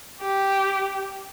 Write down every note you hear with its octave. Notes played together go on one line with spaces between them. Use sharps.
G4